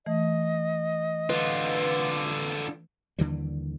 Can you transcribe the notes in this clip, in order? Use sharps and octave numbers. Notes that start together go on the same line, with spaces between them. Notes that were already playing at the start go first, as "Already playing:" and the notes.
E3 A3 D#5
D3 F4 B4
D#2 D3 E3 G3